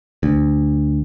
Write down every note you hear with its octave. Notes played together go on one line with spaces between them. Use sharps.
D2